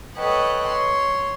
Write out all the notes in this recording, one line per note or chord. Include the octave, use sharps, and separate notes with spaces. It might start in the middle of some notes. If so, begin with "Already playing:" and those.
A4 B4 C#5 D#5 F#5 G5
C#5 C6